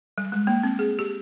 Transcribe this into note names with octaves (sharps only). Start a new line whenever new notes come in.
G3
G#3
A#3
C4
G#4
G4